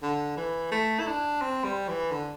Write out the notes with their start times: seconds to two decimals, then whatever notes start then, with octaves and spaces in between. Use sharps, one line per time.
0.02 D3
0.37 E3
0.72 A3
0.99 E4
1.07 D4
1.41 C4
1.65 G3
1.88 E3
2.11 D3